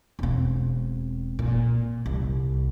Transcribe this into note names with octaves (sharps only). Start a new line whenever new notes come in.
E1 C4
A#2
C2